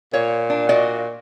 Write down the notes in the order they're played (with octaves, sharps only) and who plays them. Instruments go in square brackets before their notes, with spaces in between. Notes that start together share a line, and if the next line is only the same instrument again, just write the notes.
[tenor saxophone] A#2 [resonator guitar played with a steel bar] C#5
[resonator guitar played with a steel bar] D4
F#4 D5 D#5